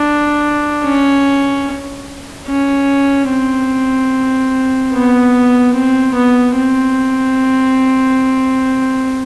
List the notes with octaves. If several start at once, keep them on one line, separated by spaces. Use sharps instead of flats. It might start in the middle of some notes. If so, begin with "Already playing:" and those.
Already playing: D4
C#4
C#4
C4
B3
C4
B3
C4